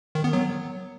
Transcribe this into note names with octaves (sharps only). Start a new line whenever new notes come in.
D#3
B3
F#3